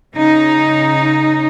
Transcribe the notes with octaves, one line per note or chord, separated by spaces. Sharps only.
C#3 D#4